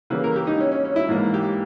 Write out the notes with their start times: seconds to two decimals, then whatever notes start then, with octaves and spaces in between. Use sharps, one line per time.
0.10 C#3 E3 G3 A#3 B4
0.24 A#4
0.36 G4
0.47 D#4
0.60 C#4
0.72 C#4
0.85 C#4
0.96 E4
1.09 G#2 E3 A#3
1.34 G4